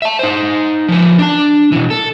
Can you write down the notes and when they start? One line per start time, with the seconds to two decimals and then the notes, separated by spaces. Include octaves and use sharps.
0.02 E5 A5
0.19 D#4 C5
0.88 F3 B4
1.19 D4 A5
1.72 B2 E3
1.90 A4